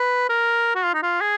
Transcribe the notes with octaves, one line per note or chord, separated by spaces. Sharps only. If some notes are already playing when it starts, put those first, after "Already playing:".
Already playing: B4
A#4
F#4
F4
D#4
F4
G#4